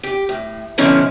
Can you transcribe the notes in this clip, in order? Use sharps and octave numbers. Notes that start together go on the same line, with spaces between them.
G4
A2
B2 D3 F3 C#4 D#4 E4